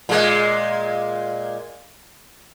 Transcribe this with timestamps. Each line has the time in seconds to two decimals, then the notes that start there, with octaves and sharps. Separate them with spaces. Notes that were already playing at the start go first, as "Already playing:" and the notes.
0.09 A#2 G#3